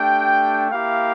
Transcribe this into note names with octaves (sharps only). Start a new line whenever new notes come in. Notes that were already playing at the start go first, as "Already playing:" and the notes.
Already playing: A3 D4 G4 G5
A#3 E4 G4 F5